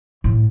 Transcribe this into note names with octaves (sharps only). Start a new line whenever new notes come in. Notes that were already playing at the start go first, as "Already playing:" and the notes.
A2